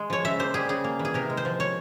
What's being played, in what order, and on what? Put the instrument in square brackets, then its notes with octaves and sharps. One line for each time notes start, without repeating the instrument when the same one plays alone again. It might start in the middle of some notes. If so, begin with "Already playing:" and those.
Already playing: [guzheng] G#3
F3 C#5
C#3 E5
A#3 C5
G3 G#4
C#3 G#4
A#3
E3
G#4
C3 A#4
G#3
C5
F3
C#5